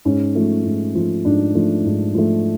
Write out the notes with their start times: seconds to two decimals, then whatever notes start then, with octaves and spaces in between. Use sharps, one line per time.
0.05 G#2 C#4
0.35 F3 A3
0.65 G#2
0.95 F3 A3
1.25 G#2 D4
1.55 F3 A3
1.85 G#2
2.14 F3 A3